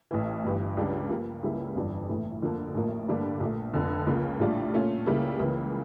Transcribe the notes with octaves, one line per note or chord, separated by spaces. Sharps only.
A1 A2 E3
G1 G2 E3
C#2 C#3 G3 D4 G4
G2 F3 A#3
C#2 C#3 G3 A#3 E4
G1 F2 E3 G3 D4
A#1 A2 E3 A3
F2 D3 F3 A#3
A1 A2 F3 A#3
G2 D3 G3 A#3 D4
A#1 A#2 A3
F1 F2 D3
C#2 C#3 F3 A#3
A#1 A2 G3 D4 F4
A#2 A3 C#4 F4
C#2 C#3 G3 A#3 E4
C#2 C#3 E3 A#3